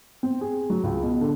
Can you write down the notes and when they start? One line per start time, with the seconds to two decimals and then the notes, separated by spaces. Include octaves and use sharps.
0.23 C4
0.41 G#4
0.70 F#3
0.83 C#2
1.03 B2
1.21 D3